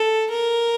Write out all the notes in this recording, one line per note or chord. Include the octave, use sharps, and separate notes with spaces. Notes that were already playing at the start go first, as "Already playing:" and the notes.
Already playing: A4
A#4